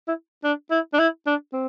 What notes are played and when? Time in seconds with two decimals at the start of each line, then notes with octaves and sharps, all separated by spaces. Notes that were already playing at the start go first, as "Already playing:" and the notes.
0.08 E4
0.44 D4
0.71 E4
0.94 D4
0.99 E4
1.27 D4
1.53 C4